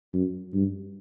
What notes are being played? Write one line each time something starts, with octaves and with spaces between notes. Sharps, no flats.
F#2
G2